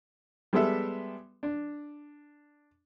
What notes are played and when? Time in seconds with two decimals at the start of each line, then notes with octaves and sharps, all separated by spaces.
0.53 G3 G#3 B3 G4 A4 E5
1.43 D4